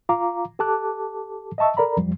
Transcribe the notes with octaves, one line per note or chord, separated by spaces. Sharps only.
F4 F5 A#5 D6
G4 A4 A5 D6 F#6
D#5 E5 A5 C#6 E6
A4 A#4 D5 A#5 B5
F2 F3 G3